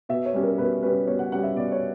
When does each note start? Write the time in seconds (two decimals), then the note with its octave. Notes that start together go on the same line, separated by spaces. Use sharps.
0.09 B2 E5
0.25 C#5
0.34 G3 C#4
0.43 A#4
0.58 B2 B4
0.83 G3 C#4 B4
1.07 B2 C#5
1.19 F#5
1.32 G3 C#4 F#5
1.43 E5
1.56 B2 D5
1.72 C#5